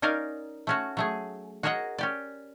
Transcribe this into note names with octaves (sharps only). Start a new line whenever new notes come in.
C#4 D#4 A#4 D5 F5
A3 C#4 F#4
F#3 A3 G#4
F#4 G#4 A#4 C#5 D#5 F#5
C#4 G4 D5